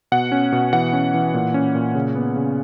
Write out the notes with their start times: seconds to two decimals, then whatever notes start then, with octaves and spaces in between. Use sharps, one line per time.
0.12 B2 F#5
0.32 C#4
0.52 B2
0.73 E3 F#5
0.93 C#4
1.14 E3
1.34 A#2
1.54 C#4
1.75 A#2
1.95 C#3
2.16 B3
2.36 C#3